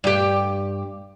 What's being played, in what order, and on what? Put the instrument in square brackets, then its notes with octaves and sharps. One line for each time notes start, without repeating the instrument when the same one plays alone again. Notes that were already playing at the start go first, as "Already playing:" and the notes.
[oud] G2 G4